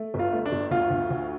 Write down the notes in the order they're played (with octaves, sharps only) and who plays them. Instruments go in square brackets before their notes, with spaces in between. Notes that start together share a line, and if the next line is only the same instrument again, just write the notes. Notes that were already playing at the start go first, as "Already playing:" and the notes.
Already playing: [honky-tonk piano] A3
G1
[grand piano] F4
[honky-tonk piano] A3
[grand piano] D4
[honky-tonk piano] G1
[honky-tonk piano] D2 [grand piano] F4
[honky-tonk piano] D2
D2